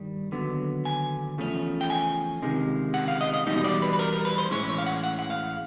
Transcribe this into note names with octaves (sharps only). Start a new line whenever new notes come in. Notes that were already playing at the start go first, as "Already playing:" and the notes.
Already playing: G2 D#3 G3
D#2 D3 F#3 B3
G#5
E2 C#3 F3 A3 C#4
G5
G#5
C#2 C3 D#3 G#3
F#5
F5
D#5
D#5
E2 B2 G3 C4 D#4 D#5
D#5
D5
B4
B4
A#4
A#4
B4
C5
A2 E3 G#3 C#4 C#5
C#5
F5
F#5
F#5
F#5
F5